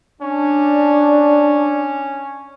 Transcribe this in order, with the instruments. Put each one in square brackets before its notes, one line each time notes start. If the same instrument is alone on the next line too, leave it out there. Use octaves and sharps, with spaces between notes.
[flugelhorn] C#4 [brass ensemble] D4